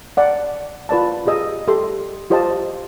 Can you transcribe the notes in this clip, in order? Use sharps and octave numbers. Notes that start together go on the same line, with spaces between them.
D5 F#5
F4 B4 D5 A5
F4 G4 G#4 D#5 E6
G4 A4 E5 C6
F4 G4 C5 D#5 F5 A5